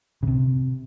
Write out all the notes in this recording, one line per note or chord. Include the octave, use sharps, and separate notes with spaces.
C#3
C3